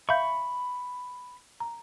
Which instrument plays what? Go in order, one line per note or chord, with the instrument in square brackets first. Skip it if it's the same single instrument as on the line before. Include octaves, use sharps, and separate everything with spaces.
[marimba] E5 F5 G6 [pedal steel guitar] B5 C#6
[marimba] A#5